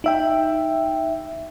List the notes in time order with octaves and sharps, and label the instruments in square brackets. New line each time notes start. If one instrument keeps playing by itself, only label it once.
[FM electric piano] D#4 E5 G5